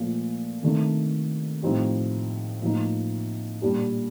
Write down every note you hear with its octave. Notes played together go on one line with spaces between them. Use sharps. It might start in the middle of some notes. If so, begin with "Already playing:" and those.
Already playing: A#2 F3 A3
C3 D#3 A3 D4
A2 F3 C4 D#4 G4
A2 F3 A#3 D#4
A#2 G3 D4 G4